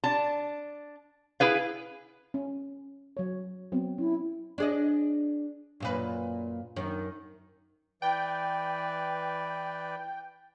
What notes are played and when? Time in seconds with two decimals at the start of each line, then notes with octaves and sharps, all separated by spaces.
0.04 D4 A5
1.40 E4 G#4 B4 F5
2.34 C#4
3.17 F#3 C#5
3.72 F#3 B3 C4
3.98 C#4 E4
4.58 D4 G#4 D#5
5.80 F#2 A#2 B4
6.76 F#2 D#3
8.02 E3 B4 D5 G5